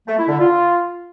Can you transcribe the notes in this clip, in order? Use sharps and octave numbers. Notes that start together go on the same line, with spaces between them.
A3
E4
D3
F4